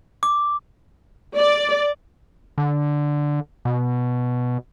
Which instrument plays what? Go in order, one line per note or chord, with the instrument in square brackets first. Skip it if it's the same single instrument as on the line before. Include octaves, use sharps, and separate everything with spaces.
[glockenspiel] D6
[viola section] D5
[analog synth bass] D3
B2